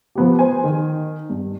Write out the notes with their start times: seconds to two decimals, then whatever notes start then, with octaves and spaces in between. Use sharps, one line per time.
0.15 F3 B3 G4
0.39 C5 G#5
0.64 D#3
1.30 G2